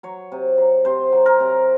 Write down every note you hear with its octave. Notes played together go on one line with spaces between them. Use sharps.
F#3 C#5
C3
F#3
C3 C5
F#3
A#4
C3